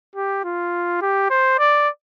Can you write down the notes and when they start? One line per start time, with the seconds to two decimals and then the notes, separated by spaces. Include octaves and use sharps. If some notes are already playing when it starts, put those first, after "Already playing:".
0.16 G4
0.44 F4
1.02 G4
1.30 C5
1.59 D5